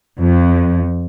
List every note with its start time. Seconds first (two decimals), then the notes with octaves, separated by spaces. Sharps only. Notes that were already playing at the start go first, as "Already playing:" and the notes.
0.18 F2